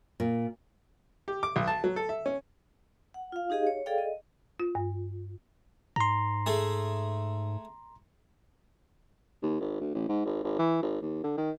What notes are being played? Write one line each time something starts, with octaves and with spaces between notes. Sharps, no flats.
A#2
G4
D6
B1
A5
F#3
A4
E5
C#4
F#5
F4 F5
D#4 G4 G#4 D#5 F5
C#5
G#4 A4 D5 F5 G5
D#5
F4
G2
G#2 A#5 C6
A3 G#4
D#2
G#1
D2
A1
G#2
G#1
G#1
E3
G#1
D#2
D3
D#3